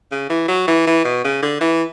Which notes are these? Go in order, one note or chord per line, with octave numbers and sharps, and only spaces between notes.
C#3
E3
F#3
E3
E3
B2
C#3
D3
E3